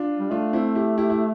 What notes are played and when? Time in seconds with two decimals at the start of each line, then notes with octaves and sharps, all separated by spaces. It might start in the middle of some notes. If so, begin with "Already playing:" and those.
Already playing: D4 F4
0.19 G3
0.31 A3 D4 F4
0.53 C4 E4
0.75 E4 G4
0.98 E4 G4
1.10 E4